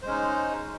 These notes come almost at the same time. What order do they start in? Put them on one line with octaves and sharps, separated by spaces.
C5 G#3 C#4 D#4